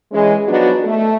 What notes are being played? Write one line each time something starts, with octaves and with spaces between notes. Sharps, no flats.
E3 G#3 C#4
F3 F#3 B3 D4 D#4 F#4
A3